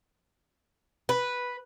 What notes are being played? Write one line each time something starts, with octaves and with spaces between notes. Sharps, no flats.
B4